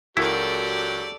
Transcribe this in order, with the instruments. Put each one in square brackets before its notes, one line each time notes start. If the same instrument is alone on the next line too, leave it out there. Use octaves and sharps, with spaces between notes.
[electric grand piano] C#2 F#4 A#4 [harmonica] F#3 G4 [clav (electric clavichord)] E4 [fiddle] A4 D5